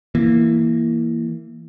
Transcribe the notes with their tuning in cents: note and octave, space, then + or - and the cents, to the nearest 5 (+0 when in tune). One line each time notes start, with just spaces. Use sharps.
E3 +5 A#3 +0